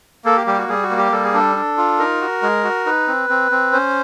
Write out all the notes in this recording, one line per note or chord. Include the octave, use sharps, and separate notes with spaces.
A#3 A4
G4
G3 G4
F#4
G3 G#4
F#4
A#3
G4
G3 A4
G#4
D4 A4
D4
F4
D#4 A#4
F#4
G#3
F#4
D#4 B4
C4
C4
C4
C#4 C5